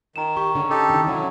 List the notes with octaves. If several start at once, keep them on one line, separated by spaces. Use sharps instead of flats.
D#3 A#5 E7
G4 C#6
D3 C#4 G#4
D#4 G4 A4
C3 D#3 E3
D3 F#3 C#4 E4